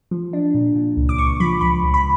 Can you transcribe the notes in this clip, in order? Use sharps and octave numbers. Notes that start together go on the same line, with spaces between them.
F3
D4
A#2
A#2
C#2
D6
C#2 C#6
F3 B5
C#2 B5
C#2
B5